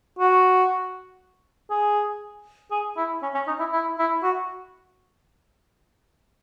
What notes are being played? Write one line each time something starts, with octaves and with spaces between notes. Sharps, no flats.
F#4
G#4
G#4
E4
C#4
C#4
D#4
E4
E4
E4
F#4